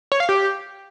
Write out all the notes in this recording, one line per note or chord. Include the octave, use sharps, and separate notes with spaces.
C#5
F5
G4